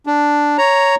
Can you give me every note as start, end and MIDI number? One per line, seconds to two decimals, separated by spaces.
0.06 0.57 62
0.58 0.95 73
0.58 0.95 82